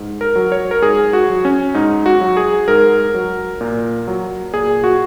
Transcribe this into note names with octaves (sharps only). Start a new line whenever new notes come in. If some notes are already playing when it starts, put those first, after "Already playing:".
Already playing: G#2
A#4
F#3
C#5
A#4
G#2 G#4
F#4
F#3
C#4
G#2 D#4
F#4
F#3
G#4
G#2 A#4
F#3
A#2
F#3
A#2 G#4
F#4